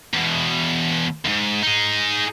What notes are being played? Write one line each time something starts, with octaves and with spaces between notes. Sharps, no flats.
E2 B2
D#2 G#2
D#4 G#4